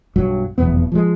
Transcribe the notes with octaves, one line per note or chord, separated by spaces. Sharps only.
B1 G2 F#3
F1 B1 E2 B3
F3 G3 G#3